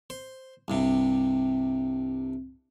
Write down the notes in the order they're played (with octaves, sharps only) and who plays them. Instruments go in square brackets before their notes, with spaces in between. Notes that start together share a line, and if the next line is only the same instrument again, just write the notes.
[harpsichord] C5
C2 G2 C3